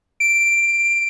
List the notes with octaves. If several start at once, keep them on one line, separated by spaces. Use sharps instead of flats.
D7